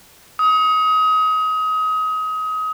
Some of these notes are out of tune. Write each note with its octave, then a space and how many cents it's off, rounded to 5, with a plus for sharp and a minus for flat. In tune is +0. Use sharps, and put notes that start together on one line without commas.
D#6 +30